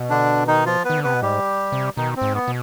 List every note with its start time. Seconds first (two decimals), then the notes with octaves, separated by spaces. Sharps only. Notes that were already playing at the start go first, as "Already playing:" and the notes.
Already playing: B2
0.10 D3 D4
0.47 D#3 D#4
0.66 F3 F4
0.85 D#3 B3 B4
0.98 D3
1.04 C3 B3 B4
1.14 B2
1.22 G#2 G3 G4
1.72 C3
1.97 B2 D#3 D#4
2.16 C4
2.22 G#2
2.34 B3
2.48 B2